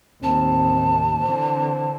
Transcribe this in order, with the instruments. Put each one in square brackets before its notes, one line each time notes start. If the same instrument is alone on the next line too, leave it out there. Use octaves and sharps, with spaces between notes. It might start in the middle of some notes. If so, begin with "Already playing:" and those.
[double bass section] A1 D#2 C3 [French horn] C4 [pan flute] A5
[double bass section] D3 E3 C4 [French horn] C5